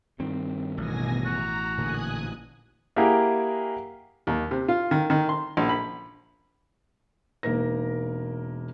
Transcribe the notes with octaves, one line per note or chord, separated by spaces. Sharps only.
G2 D#3 C4
A1 B2 G#5 A#6
F#4 A#5
A#2 D3 A#3 G#5 D#6 F#6
A#3 E4 G4 G#4 A#4 F#5
D#2
C3
F4
D#3
D#3
C6
A#1
B5
E1 A#3 D#4 A#4 A#6